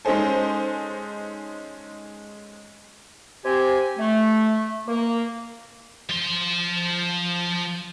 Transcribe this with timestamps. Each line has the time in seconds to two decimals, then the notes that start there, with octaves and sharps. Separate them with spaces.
0.05 G#3 C#4 D#4 A4 C5 G#5
3.44 C4 G4 G#5
3.98 A3
4.87 A#3
6.09 F3 C6